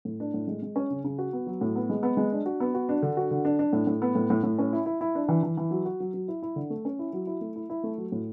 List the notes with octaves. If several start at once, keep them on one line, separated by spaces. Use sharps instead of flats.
A2
D4
A2
G#3
G#3
C#4
C#3
C#3
F#4
B3
F#3
A2
B3
G#3
B3
G#3
D4
F#4
B3
F#4
D4
D3
F#4
D3
D4
D4
A2
A2
B3
A2
A2
A2
C#4
E4
E4
E4
D4
E3
E3
E3
F#3
F#4
F#3
F#3
E4
E4
D3
A3
C#4
E4
F#3
E4
A3
E4
E4
A3
F#3
A2